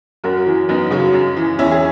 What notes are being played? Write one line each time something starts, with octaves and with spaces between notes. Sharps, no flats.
F#2 F#4 A#4
E3
F#2 B3 D#4
C#3 F#3
F#2
E3
E2 C#4 E4
G#4